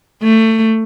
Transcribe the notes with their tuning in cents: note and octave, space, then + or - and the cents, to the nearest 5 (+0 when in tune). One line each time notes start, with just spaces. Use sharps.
A3 +20